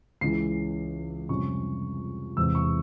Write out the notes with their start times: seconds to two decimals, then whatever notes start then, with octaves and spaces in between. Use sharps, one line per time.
0.21 C#2 C#3 E3 C7
1.29 F2 C3 G3 C#4 C#6
2.37 E1 E2 C3 E6
2.55 C#6